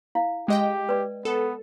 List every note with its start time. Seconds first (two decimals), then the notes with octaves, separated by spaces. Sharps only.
0.15 E4 F5
0.48 G#3 G4 D#5 G5
0.89 B4 D5
1.25 B3 A4